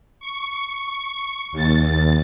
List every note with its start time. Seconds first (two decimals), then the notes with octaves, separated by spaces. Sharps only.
0.20 C#6
1.52 D#2 A6